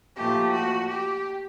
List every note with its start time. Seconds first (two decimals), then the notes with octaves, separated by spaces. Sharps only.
0.17 A#2 F3 A3 G4
0.53 F#4
0.89 G4